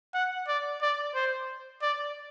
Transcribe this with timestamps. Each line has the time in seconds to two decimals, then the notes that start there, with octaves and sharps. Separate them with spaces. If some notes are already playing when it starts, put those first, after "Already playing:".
0.14 F#5
0.48 D5
0.82 D5
1.15 C5
1.82 D5